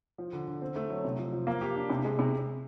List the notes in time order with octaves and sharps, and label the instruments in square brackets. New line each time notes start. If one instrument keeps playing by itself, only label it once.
[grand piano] F3
D3
D3
C4
A3
F#3
C3
F3
F3
A#3
G4
D4
C3
G#3
C3